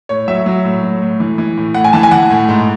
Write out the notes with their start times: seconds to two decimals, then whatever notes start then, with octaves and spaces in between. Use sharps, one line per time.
0.09 A2 C#5
0.28 F#3 E5
0.46 F#3
0.65 A2
0.83 F#3
1.02 A2
1.20 E3
1.38 E3
1.57 A2
1.74 A2 F#5
1.84 G#5
1.93 E3 A5
2.03 G#5
2.11 E3 F#5
2.30 A2
2.49 G#2